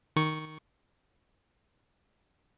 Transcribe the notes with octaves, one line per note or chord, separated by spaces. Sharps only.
D#3 C#6